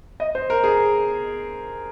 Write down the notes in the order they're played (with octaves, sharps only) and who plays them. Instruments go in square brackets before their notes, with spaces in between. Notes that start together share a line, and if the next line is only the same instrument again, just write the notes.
[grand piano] D#5
C5
A#4
G#4